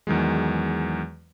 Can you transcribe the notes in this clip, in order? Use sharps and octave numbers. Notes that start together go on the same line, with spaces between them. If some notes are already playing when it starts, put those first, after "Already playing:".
E2 D#3 F#3 G#3